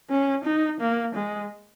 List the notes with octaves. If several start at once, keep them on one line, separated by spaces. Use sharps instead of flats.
C#4
D#4
A#3
G#3